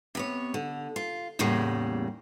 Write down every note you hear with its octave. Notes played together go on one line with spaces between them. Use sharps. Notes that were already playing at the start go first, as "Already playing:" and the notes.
C3 B3 C#5
D3
F4
E2 A2 C#3 G3 A#3